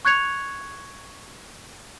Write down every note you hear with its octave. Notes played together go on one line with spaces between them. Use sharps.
C#6 F#6 G#6 C#7 F7